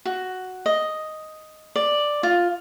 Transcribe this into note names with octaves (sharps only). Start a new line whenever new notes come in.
F#4
D#5
D5
F4